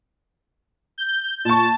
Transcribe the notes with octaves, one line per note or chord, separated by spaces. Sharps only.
G6
A#2 A5 C#6